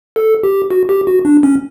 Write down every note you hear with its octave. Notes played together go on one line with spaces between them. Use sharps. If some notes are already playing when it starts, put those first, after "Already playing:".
A4
G4
F#4
G4
F#4
D4
C#4